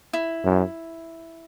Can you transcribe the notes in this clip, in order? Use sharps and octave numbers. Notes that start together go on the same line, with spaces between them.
E4
F#2